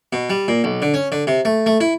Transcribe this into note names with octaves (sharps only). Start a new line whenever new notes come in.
B2
G3
A#2
B1
D3
C#4
D3
C3
A3
A3
E4